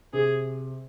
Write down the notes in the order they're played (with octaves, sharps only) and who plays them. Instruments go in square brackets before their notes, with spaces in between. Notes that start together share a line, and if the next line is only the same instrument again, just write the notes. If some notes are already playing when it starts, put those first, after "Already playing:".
[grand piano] C3 [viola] G#4